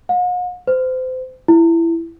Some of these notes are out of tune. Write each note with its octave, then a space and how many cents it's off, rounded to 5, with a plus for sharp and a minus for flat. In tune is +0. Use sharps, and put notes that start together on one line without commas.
F#5 -45
C5 -30
E4 +15